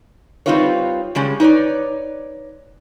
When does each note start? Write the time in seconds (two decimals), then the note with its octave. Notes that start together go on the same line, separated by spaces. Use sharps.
0.46 G3 C4 D#4 F4 B4 C#5
1.15 C#3 G3 G#3 C#4
1.40 D#4 B4 C#5 D5